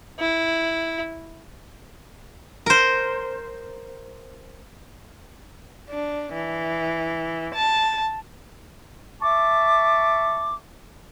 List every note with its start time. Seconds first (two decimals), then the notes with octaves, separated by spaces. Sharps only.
0.19 E4
2.66 A#4 C5
5.90 D4
6.33 E3
7.54 A5
9.22 E5 A5 C#6 D6